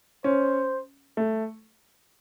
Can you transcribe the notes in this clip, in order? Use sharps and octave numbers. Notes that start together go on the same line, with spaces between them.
C#4 C5
A3